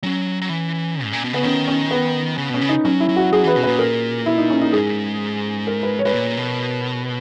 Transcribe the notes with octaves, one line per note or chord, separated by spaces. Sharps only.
F#3 C#4
F#3
E3
G#2
A#2
B2
C#3 B3
D#3 C#4
C#4
B3
C#3
B2 C#4
C#3
D#4
F#3 C#4
E4
F#3
F#4
F#3 G#4
E3 B4
B2
A#2 B4
A#4
E4
D#4
C#4
D#4
G#2 G#4
A#4
B4
C#5
G#2 B4
A#2 C#5
B2